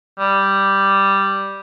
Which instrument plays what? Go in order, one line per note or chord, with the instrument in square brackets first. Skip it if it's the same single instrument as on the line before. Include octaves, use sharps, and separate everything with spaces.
[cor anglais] G3